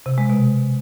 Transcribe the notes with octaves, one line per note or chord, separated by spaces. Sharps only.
C3
G#3
B2